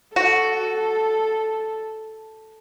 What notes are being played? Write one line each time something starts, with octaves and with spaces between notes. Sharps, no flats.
F#4 A4